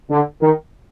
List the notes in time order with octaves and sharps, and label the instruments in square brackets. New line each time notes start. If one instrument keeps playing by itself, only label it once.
[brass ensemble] D3
D#3